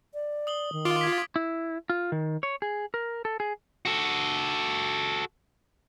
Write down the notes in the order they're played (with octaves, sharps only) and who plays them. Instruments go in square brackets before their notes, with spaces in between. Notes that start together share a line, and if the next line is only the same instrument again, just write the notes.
[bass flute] D5
[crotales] D#6 F#7 G7
[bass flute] D#3
[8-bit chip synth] F4 [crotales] D6 D7 G7
[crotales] G#6 B6
[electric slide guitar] E4
F4
D#3
C#5
G#4
A#4
A4
G#4
[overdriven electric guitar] F#4 A4